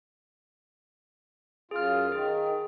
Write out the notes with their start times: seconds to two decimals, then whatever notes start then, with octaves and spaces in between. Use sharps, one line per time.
1.71 F#2 F4 G#4 F6
2.12 D#3 G#4